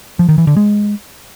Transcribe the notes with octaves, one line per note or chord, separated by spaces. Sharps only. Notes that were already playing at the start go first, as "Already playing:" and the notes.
F3
D#3
E3
D3
G#3